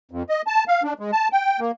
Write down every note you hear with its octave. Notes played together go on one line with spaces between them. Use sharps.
F2
D#5
A5
F5
D4
G#3
A5
G5
A#3